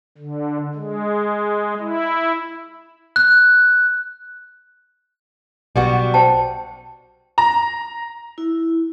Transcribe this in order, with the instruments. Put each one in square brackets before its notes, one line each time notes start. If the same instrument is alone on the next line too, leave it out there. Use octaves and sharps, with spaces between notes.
[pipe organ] D3
G#3
E4
[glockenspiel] F#6
[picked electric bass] B1 [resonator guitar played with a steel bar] G3 B3 F#4
[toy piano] C5 G5 A5
[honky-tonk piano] A#5
[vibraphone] E4